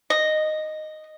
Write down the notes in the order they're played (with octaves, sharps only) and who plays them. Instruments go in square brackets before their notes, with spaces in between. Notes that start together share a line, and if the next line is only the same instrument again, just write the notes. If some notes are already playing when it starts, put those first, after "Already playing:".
[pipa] D#5